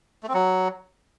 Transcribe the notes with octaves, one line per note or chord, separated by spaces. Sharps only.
A3
C4
F#3